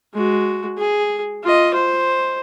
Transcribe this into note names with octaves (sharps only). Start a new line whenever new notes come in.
G#3 F#4
G#4
F4 D#5
C5